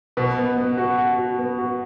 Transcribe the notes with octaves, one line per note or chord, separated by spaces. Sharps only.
B2 B4
B3
B3
F#4
F#4
F#4
B3
F#4